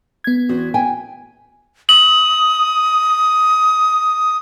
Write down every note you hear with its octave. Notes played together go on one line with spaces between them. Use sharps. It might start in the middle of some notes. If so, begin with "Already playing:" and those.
B3 G#6
E2 C4 F#4
G5 G#5
D#6 F#7